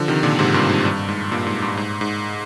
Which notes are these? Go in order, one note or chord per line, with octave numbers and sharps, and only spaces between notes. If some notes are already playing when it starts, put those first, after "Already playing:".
Already playing: D3 F3
C3 D#3
A#2 D3
G#2 C3
G2 A#2
G#2
G2
G#2
G2 A#2
G#2
G2
G#2
G#2